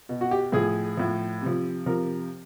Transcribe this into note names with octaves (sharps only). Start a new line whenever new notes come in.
B2
F#4
G4
A2 F3 G#4
A2 F3
C3 F3
C3 F3 A#4